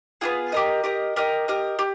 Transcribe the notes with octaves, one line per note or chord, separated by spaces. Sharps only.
B3 D4 F4 G#4
G4 A#4 D#5
G4 A#4 D#5
G4 A#4 D#5
G4 A#4 D#5
G4